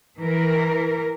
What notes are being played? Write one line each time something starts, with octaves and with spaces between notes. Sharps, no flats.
E3 A#4